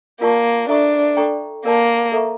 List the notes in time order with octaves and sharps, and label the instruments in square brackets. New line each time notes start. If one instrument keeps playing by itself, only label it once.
[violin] A#3 [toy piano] F4 A#4 D5 A5 C#6
[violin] D4 [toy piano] A4 E5 A#5 C#6
[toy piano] A4 D5 G5 A#5 C#6
[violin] A#3 [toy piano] A#4 D5 A5
[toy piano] A4 E5 A#5 C#6